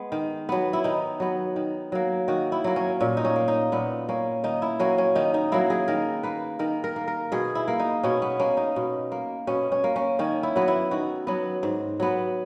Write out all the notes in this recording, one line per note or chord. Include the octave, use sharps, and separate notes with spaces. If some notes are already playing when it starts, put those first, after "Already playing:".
Already playing: G#3 B3
D#3
F#3 B3
E4
D#3 D#4
F#3 B3
D#3
F#3 A#3
D#3 F#4
E4
F#3 A#3
C#4
A#2 C#4
D#4
C#4
A#3
D#4
A#2 B3
A#3 C#4
D#3 D#4
E4
F#3 A#3 C#4
C#4
D#3 D#4
D#4
F#3 A#3 E4
G#4
D#3 A#4
A#3 B4
D#3 A#4
A#4
A#3
A#4
B2 G#4
E4
A#3
D#4
B2 C#4
B3
A#3 C#4
D#4
B2
A#3
B2 C#4
C#4
A#3
C#4
D#3 C#4
E4
F#3 B3
E4
D#3 F#4
F#3 B3
G#2
F#3 B3